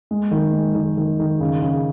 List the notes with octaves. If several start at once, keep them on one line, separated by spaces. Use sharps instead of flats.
G#3
D#3
G#3
D#3
D#3
D#3
C#3
C#3